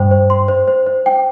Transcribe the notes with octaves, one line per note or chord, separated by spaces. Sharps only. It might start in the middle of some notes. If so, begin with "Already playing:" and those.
Already playing: G2 C5 G5
C5
C6
C5
C5
C5
G5